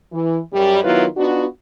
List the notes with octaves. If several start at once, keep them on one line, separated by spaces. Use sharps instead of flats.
E3
F#2 G3
D#3 F#3 B3 E4 F4 B4
B3 D4 D#4 F4 F#4